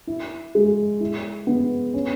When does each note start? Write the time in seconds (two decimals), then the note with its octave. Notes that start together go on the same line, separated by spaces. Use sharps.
0.07 E4
0.55 G#3
1.00 E4
1.47 B3
1.94 C#4